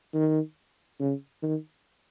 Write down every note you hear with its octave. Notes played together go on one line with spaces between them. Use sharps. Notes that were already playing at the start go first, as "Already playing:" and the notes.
D#3
C#3
D#3